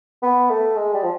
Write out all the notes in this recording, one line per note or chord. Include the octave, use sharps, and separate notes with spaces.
B3
A3
G#3
G3
F3